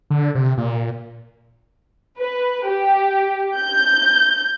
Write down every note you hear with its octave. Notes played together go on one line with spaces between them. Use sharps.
D3
C3
A#2
B4
G4
G6